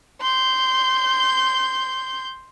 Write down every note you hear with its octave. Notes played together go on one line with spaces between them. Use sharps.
C6 G6